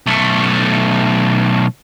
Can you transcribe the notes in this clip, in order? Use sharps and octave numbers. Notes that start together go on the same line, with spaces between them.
B1 A3